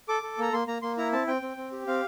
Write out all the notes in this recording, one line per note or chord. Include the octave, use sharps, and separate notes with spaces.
A4 D6
A4
A#3 A#5
A#3 C6
A#3 A#5
A#3 C6
E4 A#5
C4 A5
C4 G5
C4
C4
G4
C4 F5